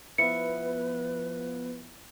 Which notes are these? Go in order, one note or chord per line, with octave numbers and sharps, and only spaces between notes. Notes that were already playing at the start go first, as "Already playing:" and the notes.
F3 B3 E4 B4 C#7